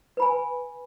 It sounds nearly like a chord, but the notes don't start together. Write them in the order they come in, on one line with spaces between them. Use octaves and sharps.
B4 B5 G#5